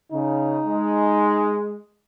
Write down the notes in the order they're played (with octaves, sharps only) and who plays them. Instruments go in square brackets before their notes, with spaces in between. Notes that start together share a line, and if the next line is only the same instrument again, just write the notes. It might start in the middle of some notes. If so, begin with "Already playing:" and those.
[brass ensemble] C#3 [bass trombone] D#4
[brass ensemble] G#3